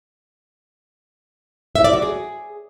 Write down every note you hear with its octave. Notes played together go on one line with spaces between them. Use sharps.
E5
D5
F#4
G#4